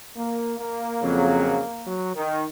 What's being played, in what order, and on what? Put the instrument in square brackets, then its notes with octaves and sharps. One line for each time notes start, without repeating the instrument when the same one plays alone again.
[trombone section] A#3
A#3
[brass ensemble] F2 C#3 F#3
[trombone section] F#3
D#3